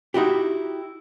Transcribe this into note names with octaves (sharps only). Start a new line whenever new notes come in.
D#4 E4 F#4 G4